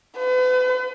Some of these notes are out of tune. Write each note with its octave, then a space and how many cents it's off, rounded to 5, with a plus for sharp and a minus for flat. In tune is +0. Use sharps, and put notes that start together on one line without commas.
B4 +40